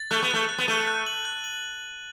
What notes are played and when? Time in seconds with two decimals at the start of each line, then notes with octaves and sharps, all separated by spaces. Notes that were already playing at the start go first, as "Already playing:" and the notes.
Already playing: A6
0.11 A3 F#6
0.22 B3
0.31 A3 F#6
0.49 F#6
0.58 B3
0.68 A3 D#7
0.87 F#6
1.06 F#7
1.25 F#6
1.44 F#7